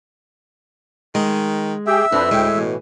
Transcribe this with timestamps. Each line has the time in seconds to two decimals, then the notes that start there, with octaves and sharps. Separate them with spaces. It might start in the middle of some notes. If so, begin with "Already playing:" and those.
1.15 D#3 G#3
1.87 G4 G#4 E5 G5
2.12 F2 C4 D4 E4 B4
2.31 D2 A2 G#3 G5
2.55 B2 E3